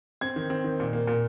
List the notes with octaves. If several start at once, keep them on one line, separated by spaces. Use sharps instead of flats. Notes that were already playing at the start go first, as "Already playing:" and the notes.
C4 G#6
D#3
C4
D#3
A#2
A#3
A#2